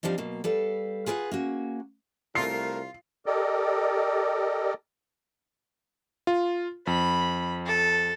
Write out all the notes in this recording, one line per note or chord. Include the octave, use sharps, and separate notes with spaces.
F3 G3 C4 D4 D#4
B2 F#3 A#3
G3 A4 B4 F5
F4 G#4 B4 D5 F#5
A#3 C#4 F#4
C2 A3 F4 A#4 C7
G4 A4 A#4 D5 D#5
F4
F2 B5
A4